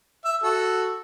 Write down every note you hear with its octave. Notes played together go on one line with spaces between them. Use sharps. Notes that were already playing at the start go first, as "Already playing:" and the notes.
E5
F#4 A4